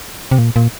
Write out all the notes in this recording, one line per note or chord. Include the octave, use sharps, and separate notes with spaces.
C3
A#2
A#2